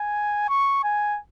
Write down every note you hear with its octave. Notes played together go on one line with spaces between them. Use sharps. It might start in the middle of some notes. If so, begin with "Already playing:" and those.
Already playing: G#5
C#6
G#5